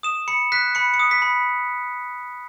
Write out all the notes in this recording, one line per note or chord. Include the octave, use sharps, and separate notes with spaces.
D#6 E7
B5 C#7
F#6 B6
B5 C#7
C#7
D#6
B6
B5